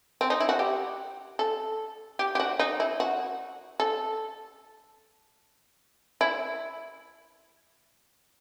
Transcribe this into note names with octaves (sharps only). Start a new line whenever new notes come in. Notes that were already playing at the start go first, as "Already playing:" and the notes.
C4
D#4
E4
F#4
G4
A4
G4
G4
F#4
D#4
E4
F#4
A4
E4